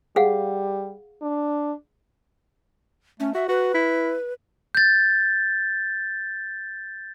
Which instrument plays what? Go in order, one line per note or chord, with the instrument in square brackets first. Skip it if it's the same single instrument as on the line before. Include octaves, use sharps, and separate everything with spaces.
[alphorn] G3 [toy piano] G#4 F5 F#5
[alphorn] D4
[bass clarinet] A3 [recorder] C#4
[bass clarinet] F#4 [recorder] E5
[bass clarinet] F#4 [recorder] B4
[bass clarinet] E4
[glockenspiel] G6 A6